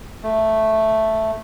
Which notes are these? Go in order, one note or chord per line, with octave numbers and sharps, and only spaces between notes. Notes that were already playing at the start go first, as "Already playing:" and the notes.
A3